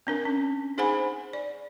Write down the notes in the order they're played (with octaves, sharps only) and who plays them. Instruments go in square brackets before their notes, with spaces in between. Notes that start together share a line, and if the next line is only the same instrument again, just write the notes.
[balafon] C4 D4 A#4
C#4
D#4 G#4 C5 F#5 G#5 B5
D5